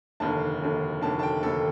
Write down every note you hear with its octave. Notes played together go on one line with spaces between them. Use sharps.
F1 D#2 D3 A5
F1 D#2 D3
F1 D#2 D3 A5
A5
G5
F1 D#2 D3 A4